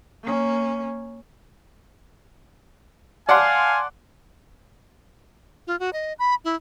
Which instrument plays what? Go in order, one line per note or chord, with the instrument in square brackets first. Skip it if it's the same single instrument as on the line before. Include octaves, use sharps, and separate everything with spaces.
[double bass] A#3 C#4
[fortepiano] D5 F#5 [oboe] F5 [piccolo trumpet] G#5 [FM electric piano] A5 C6
[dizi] F4
F#4
D#5
B5
E4